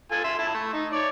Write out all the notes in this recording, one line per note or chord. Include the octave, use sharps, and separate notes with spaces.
F4 A4 G#5
E5 C6 E6
E4 A5
A3
D#4
C#5 D5